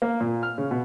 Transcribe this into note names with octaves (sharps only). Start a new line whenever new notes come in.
A#3
A#2
F6
C#3
B2